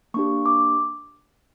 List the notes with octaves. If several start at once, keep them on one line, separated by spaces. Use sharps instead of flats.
A#3 D4 G4 C#6
D6